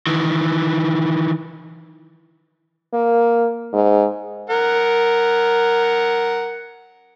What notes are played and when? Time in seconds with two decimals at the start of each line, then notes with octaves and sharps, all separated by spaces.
0.07 D#3 E3
2.93 A#3
3.73 G#2
4.50 A#4 F#5